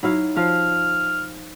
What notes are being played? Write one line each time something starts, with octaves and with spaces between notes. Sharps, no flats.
F#3 D#4 E4 F5
F3 F5 F6